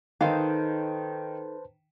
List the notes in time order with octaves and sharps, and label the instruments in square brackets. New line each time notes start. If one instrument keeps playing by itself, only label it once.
[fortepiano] D#3 [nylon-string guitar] D#4 A4 F5 [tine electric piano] B4 C5 A5